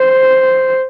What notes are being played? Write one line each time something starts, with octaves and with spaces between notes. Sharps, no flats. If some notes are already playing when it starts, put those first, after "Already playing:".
Already playing: C5